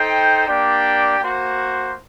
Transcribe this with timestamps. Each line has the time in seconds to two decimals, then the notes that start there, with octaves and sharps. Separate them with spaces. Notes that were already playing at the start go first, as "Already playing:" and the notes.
Already playing: D#4 A4 C5 G5
0.46 A#3 D4 G4 D5 G5
1.19 A#3 F#4 C5